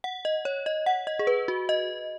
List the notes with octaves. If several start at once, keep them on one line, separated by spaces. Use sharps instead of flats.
F#5
D#5
C#5
D#5
F#5
D#5
G#4
B4
F#4
D#5